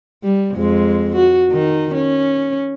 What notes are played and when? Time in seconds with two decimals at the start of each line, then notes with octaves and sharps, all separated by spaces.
0.23 G3
0.55 F2 G#3
1.16 F#4
1.51 D#3 D#4
1.94 C#4